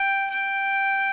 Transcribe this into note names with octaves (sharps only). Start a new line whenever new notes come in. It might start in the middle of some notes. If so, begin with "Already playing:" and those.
Already playing: G5
G5